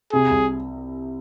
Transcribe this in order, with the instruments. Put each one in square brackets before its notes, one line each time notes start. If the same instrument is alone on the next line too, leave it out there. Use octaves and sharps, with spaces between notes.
[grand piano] C3 [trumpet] G#4
[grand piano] C2